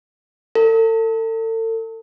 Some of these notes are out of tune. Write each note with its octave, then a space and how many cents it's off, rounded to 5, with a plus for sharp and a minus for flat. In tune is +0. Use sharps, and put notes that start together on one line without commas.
A4 +35